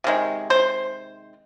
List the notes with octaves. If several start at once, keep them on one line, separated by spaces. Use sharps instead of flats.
C3 D#3 G#3
C5